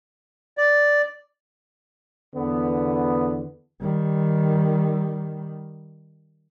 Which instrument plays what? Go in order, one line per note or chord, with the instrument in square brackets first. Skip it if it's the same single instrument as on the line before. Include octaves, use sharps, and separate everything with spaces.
[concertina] D5
[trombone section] E2 D3 B3
[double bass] D#3 G3